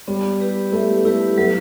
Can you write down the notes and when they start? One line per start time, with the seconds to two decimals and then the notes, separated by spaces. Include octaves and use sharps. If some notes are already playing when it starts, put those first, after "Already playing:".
0.07 G3 B3
0.40 E4 G4 B4
0.72 A3 B3
1.05 A3 E4 G4 B4
1.37 F#3 A3